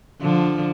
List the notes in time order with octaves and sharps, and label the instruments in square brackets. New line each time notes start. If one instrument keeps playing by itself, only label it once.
[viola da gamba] D3 F3